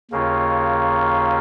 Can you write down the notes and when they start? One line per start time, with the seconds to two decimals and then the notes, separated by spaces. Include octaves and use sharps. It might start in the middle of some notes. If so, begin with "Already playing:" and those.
0.11 D#2 C#3 A#3 C#4 F4